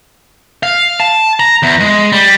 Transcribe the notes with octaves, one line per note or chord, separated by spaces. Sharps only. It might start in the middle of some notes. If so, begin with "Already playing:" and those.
F5
A5
A#5
E2
G#3
G3